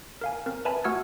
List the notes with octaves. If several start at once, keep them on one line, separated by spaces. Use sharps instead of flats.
A#4 F5 G#5
C4 A#4
B4 E5 G#5 A5 B5
A3 F#4 F#5 E6 F6 G#6